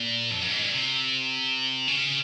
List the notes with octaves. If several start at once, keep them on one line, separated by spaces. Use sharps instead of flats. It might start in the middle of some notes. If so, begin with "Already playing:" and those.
Already playing: A#2
F2
F#2
G#2
A#2
C3
C#3